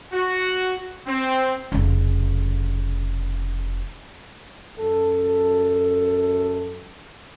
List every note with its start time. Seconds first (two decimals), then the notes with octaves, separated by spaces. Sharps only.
0.12 F#4
1.07 C4
1.72 F1 C#3
4.76 F#2 A4